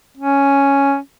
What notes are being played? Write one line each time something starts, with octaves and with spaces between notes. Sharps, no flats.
C#4